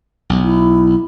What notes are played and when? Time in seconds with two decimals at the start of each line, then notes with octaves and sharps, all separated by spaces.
0.30 B1
0.44 E4